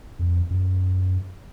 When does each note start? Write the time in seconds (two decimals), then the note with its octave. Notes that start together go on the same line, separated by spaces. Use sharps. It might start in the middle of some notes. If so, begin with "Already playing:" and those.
0.19 F2
0.50 F#2